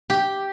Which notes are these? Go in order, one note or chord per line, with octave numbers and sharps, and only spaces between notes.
G4